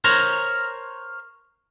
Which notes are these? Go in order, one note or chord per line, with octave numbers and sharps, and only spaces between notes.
A#4 C5 C#5 A#5